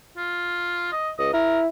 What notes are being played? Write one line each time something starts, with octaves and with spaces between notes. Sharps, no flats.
F4
D#5
C#2 D#5
E4 A#4